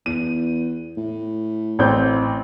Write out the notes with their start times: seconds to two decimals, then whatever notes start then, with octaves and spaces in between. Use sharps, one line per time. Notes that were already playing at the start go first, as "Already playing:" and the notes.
0.06 E2 D#7
0.97 A2
1.79 A1 C4 G6